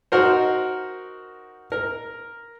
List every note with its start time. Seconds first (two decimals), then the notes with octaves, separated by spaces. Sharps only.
0.12 D#4 F#4 A#4 C5
1.72 A#4